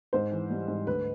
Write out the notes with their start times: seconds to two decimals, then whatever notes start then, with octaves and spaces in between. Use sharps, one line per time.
0.13 G#2 C5
0.32 E3
0.50 G3
0.68 G#2
0.87 D2 B4